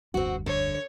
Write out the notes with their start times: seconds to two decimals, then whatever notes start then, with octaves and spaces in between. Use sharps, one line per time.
0.14 F1 D2 G2 C4 F#4
0.46 D3 C#5